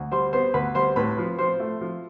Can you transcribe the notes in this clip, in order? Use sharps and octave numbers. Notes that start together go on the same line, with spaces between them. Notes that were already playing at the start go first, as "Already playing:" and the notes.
Already playing: D2
G3 C5 C6
B3 C5 C6
D2 B4 B5
G3 C5 C6
A2 B4 B5
F3
F3 C5 C6
A3
F3